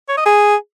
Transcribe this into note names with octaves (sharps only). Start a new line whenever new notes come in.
C#5
D#5
G#4